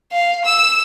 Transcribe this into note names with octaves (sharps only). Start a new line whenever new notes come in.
F5
E6